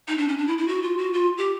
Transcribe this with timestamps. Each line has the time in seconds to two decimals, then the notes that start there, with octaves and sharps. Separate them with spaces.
0.08 D#4
0.18 D4
0.28 C#4
0.38 D4
0.48 E4
0.58 E4
0.68 F#4
0.83 F4
0.98 F#4
1.13 F4
1.38 G4